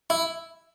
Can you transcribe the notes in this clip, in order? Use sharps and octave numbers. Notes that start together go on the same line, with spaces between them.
E4